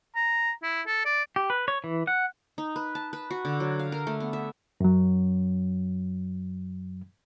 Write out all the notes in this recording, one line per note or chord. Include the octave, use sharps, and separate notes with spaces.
A#5
E4
A4
D5
G4
B4
C#5
E3
F#5
D#4
B4
A5
B4
F#4
D3
F#3
F5
A#4
A3
B3
E5
F#2 F#3